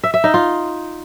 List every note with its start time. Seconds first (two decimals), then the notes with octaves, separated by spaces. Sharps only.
0.04 E5
0.14 E5
0.24 D#4
0.34 F4